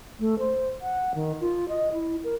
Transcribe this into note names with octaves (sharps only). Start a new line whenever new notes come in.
A3
C5
F#5
D#3
F4
D#5
E4
A#4